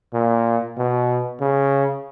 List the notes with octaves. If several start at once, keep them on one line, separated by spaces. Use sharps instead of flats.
A#2
B2
C#3